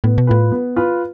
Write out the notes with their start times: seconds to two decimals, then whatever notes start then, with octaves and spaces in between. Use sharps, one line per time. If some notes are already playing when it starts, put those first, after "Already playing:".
0.04 A2 B3
0.18 B2
0.27 A2 F4 B4
0.52 B3
0.76 F4 B4